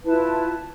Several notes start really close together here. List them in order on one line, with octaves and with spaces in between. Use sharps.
B4 E4 A5 F4